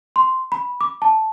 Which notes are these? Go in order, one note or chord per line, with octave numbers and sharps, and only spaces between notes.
C6
B5
D6
A5